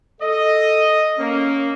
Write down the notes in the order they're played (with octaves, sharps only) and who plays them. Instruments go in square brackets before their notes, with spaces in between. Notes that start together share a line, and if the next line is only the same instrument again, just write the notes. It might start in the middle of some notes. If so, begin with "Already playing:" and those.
[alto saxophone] A4 [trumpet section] D#5
[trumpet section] A#3 [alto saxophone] C#4